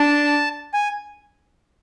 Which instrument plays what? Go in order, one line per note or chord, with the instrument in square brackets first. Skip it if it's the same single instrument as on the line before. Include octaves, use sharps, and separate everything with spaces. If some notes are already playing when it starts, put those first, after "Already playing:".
Already playing: [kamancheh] D4 [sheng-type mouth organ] A5
[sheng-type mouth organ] G#5